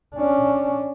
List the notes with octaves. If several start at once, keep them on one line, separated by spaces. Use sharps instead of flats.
C#4 D4